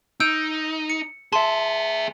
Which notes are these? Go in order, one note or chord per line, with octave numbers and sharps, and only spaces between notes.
D#4 E6 G6 D7
C#7
G#4 E5 A5 C6